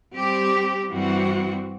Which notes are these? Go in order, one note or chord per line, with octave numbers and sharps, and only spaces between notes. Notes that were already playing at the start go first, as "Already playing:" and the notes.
G3 C4 G4
G2 E3 G3 C4 F#4